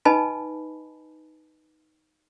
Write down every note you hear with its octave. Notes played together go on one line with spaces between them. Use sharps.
D#4 B4 D#5 G#5 A5 B5